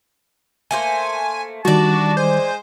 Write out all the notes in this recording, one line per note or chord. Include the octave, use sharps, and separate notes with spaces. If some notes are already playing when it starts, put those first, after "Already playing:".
A3 A#3 C5 G#5
D#3 E3 G3 D4 F#4 D5 A5
G#3 C5 G#5